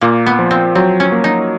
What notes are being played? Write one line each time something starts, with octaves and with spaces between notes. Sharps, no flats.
A#2 A#3
B3
F3
C4
F#3 C4
C#4
A#3
D#4